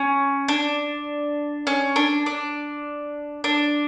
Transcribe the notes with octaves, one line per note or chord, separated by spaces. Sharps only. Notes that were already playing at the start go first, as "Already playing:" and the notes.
Already playing: C#4
D4
C#4
D4
D4
D4